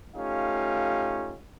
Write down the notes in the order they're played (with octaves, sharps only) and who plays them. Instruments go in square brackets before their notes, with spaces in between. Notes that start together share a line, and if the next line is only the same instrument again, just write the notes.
[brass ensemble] A3 C#4 D#4 F4 G4 F5